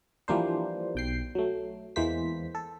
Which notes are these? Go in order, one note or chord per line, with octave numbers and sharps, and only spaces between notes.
E3 F3 G3 A#3 D4 C5
B1 G5 C7
F#3 A3
E2 E3 G#3 A#3 C5 B6
A4